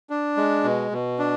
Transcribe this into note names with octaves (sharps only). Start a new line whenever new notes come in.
D4
G#3
B2
B2
D4